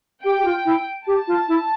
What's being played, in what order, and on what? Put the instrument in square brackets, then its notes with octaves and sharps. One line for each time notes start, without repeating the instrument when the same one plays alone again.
[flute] G4 [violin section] G5
[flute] G4
F4
E4
[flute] G4 [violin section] A5
[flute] F4
E4